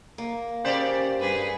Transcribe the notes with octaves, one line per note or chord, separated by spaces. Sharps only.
A#3
C#3 G4 C5 D5
G2 G#4 B4